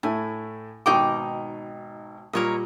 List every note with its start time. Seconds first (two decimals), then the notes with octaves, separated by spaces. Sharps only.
0.03 A2 A3 E4 G#5
0.86 G#1 B2 D#4 G5 C#6 D6
2.33 A#2 G3 A#4 C#5 D#5